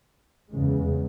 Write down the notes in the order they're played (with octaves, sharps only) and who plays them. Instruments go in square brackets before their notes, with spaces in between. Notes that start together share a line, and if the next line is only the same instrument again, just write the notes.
[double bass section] E2 C#3 G#3